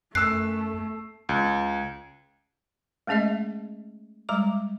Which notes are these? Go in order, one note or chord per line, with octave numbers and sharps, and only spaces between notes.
F#2 A3 E6 F#6 C7
C#2
G#3 A3 C#4 G#4 D#5 E5
G3 G#3 A#5 D6